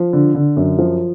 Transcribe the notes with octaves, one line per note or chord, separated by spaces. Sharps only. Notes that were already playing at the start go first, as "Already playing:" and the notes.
Already playing: F3
D3
D3
F#2
F3